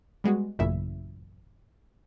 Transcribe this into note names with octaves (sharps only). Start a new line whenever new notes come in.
G3 G#3 B3 F#4
A1 F#2 A#2 C#3 E4 E5